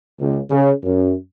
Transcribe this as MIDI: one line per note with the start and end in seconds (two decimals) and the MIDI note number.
0.20 0.39 37
0.50 0.72 49
0.83 1.13 42